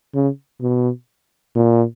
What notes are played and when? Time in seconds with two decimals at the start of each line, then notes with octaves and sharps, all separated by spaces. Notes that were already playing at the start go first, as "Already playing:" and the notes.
0.14 C#3
0.61 B2
1.55 A#2